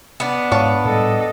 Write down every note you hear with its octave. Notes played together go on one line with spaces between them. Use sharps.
B3 D4
G#2 C#5 F5 A5
A2 G3 A4 D#5